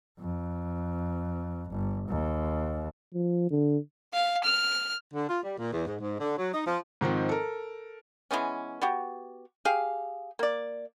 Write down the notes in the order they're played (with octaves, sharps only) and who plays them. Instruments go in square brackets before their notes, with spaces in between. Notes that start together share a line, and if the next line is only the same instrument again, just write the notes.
[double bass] F2
G1
D#2
[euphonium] F3
D3
[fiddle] F5
F6
[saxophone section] D3
F4
G3
A#2
E2
G#2
G#2
D3
F#3
D#4
F3
[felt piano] G#2 D#3 F3 C4
A4 A#4
[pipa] E3 G#3 B3 C#4
B3 F#4 G4
G4 G#4 F5
A#3 D5